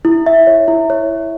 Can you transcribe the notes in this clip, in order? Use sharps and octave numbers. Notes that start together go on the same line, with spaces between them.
E4
E5
C#5
E4
C#5